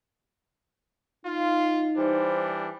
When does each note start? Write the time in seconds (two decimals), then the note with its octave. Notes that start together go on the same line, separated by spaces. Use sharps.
1.26 D#4 F4
1.97 E3 G3 D4 C5